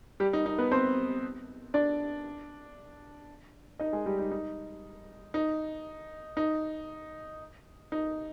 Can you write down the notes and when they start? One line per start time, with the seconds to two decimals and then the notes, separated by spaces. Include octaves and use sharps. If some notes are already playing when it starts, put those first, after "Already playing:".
0.20 G3 G4
0.33 D#4
0.46 D#4
0.58 B3 B4
0.71 C4 C5
1.74 D4 D5
3.79 D#4 D#5
3.93 G#3 G#4
4.06 G3 G4
4.19 D#4
4.31 D#4
5.34 D#4
6.37 D#4
7.92 D#4